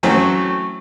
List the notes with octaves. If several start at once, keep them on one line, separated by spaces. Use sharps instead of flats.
E3 F#3 A3 C4 C#4